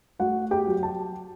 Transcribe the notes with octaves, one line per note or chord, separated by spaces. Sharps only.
A3 F#4 F#5
G4 G5
F#3
A5